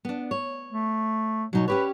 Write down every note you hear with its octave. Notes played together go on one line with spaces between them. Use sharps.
B3 D4
C#5
A3
B2 F#3 D#4 C#5
C#4 G4 B4 C#5